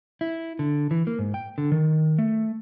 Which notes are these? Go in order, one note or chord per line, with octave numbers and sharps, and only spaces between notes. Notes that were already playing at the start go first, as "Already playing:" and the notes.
E4
D3
E3
A#3
G#2
G5
D3
D#3
A3